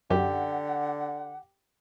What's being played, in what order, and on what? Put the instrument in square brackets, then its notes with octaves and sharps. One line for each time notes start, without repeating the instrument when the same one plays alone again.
[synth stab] F#2 [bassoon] D3 [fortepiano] G4 [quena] F#5